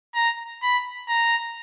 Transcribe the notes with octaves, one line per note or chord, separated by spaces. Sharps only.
A#5
B5
A#5